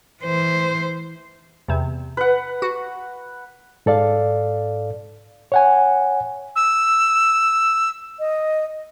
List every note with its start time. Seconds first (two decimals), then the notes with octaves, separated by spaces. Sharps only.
0.22 E3 C5
1.68 E2 C3
2.17 B4 F#5
2.62 F#4
3.86 G#2 A4 D5 F5
5.52 C#5 F#5 G#5
6.56 E6
8.19 D#5